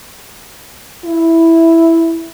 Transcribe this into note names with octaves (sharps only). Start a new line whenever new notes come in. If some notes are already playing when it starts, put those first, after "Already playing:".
E4